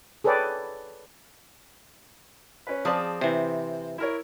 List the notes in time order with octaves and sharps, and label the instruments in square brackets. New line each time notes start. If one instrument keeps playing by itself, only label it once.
[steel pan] G#4 A4 B4 C#5 D5 G5
[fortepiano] C#4 B4
[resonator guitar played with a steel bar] F3 G#4 A5 [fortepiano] C4 D5
[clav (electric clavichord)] C3 E3 [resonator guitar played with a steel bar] C5
[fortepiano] E4 A#4 C#5